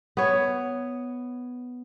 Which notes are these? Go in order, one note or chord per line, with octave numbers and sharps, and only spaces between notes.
B3 C#5